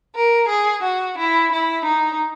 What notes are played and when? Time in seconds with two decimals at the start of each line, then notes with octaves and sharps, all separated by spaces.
0.15 A#4
0.48 G#4
0.82 F#4
1.17 E4
1.52 E4
1.85 D#4